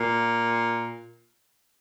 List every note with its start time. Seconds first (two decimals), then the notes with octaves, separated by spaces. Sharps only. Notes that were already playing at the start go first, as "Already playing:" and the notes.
Already playing: A#2